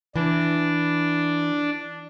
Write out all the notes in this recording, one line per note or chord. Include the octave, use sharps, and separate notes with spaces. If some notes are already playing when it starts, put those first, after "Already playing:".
E3 D4